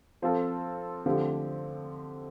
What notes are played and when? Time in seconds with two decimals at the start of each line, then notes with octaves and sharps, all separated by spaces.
0.22 F3 C4 F4 A4
1.06 D3 F3 A3 C4 G4